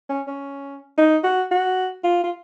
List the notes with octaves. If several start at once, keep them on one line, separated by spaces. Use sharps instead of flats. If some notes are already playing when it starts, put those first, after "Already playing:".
C#4
C#4
D#4
F#4
F#4
F4
F4